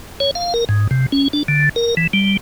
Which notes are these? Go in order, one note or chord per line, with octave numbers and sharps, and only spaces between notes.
C#5
F5
A#4
G#2
C3
C#4
D4
D3
A#4
E3
G3